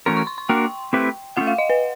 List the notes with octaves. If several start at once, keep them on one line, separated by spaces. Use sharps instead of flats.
E3 A3 C#4 F#4 A#4 C6
C#6
C6
C6
A#3 D4 F#4 A#4 G5
A3 C4 E4 G4 B4
A3 C#4 F4 F#5
F5
D#5
B4